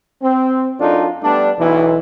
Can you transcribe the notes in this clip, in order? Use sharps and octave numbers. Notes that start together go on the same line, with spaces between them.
C4
F#2 D4 D#4 F4 A4
G3 A3 B3 D4
B1 E3